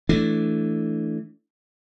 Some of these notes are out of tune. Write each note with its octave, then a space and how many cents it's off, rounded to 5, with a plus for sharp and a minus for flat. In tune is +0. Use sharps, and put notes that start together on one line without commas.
E3 +0 A3 +0 D4 -15